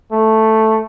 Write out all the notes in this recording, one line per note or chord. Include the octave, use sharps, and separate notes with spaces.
A3